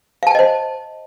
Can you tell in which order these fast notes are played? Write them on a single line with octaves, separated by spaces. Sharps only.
F5 A5 G5 D#5 C5